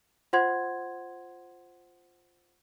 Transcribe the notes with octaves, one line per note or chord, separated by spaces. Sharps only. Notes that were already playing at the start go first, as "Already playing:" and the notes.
F4 C5 F#5 C6 G#6